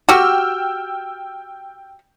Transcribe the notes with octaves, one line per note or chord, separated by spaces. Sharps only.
F#4 G4 G5 E6 F6